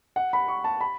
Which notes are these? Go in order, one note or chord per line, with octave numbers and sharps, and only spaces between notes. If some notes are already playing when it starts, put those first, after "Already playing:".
F#5
B5
C#6
A5
B5